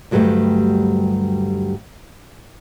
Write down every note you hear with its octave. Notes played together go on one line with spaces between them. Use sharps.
D2 G2 F#3 G3 A3